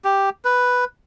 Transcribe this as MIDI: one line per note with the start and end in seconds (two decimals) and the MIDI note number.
0.04 0.30 67
0.45 0.85 71